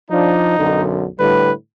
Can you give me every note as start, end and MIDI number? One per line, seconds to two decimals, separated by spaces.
0.11 0.54 53
0.11 0.54 62
0.11 0.82 63
0.58 1.06 35
0.58 1.06 42
0.58 1.06 50
1.19 1.51 45
1.19 1.51 50
1.19 1.51 55
1.19 1.52 71